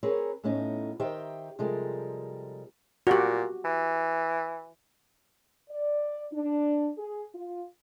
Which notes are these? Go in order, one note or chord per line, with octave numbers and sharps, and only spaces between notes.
C4 G#4 A#4 B4 C#5
A2 A3 B3 C#4 D#4
D#3 D#4 G4 C5 E5 G5
C3 F3 G3 G#3 A4 A#4
A#2 F#4 G4
E3
D5
D4
G#4
F4